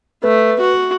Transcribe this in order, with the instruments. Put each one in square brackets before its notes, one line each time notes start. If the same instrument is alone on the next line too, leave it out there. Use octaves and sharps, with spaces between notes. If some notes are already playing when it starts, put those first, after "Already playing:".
[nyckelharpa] A3 [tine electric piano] B4
[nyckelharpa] F#4